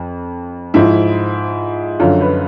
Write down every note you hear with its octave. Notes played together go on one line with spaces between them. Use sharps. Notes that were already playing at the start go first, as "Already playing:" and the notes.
Already playing: F2
G#2 F3 E4
F#2 D3 F3 F4
B4